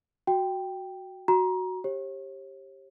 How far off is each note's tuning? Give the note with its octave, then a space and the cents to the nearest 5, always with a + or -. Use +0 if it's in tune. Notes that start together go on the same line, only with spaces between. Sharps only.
F#4 +0 G5 +0
F#4 +0 A#5 +25
G4 +0 C#5 -45